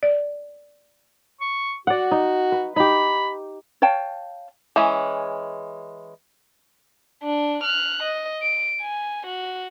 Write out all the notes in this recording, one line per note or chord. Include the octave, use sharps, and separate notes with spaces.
D5
C#6
F#4 D5 F#5
D#4
B4
D#4 G4 B5
C#5 F5 G5 A5
E3 G#3 C#4
D4
F6 F#6
D#5
D7
G#5
F#4